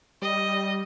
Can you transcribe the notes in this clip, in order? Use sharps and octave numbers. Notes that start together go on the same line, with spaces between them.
G3 D#5